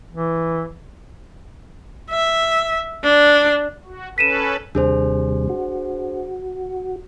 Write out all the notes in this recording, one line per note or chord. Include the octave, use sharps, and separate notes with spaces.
E3
E5
D4
F#4
C#4 A4 B4 B6 D#7 E7
D#2 C3 G3 D4 G#4 C5
F#4